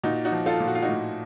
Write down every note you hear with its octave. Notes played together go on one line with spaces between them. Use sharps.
A#2 D#4 F#4
D#4 F#4
F3
F4 A4
A#2
F#4
F4
D#4 F#4
A2